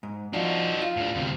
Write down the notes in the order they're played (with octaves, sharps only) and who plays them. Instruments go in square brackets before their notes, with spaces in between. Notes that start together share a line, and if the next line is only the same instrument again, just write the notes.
[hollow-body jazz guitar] G#2
[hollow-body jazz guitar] F3 D4 [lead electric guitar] D#4 F#4
[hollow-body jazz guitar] F4
[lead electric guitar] A2 D4
D2 C3